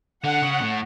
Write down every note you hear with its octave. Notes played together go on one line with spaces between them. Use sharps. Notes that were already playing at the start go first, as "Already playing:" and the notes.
D3 F#5
C#3
A2